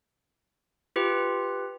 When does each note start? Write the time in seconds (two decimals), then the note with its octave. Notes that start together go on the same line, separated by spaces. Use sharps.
0.96 F4 G4 B4